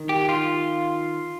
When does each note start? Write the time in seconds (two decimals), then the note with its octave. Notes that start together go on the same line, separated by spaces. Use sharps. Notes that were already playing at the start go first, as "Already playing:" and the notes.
Already playing: D#3
0.09 G4
0.29 F4